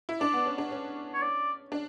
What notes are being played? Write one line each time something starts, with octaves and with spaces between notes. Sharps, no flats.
E4
D4 D5
B3
C#4
D4
C#4
C#5
D5
D4